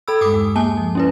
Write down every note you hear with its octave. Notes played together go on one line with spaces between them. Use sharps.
A4 B5 E6
G2 G#3 D6 D#6
D#2 G#3
A#3 G#5 A5
F3
C#4 E4 B4